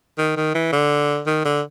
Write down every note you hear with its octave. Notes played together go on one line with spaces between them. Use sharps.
D#3
D#3
E3
D3
D#3
D3